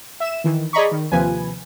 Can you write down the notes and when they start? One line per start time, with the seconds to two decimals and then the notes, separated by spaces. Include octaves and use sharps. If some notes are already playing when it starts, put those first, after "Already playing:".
0.20 E5 E7
0.44 D#3 E3
0.73 G#4 D5 D#5 A#5 B5 C#6
0.92 D#3
1.12 D#2 C3 F3 B4 G#5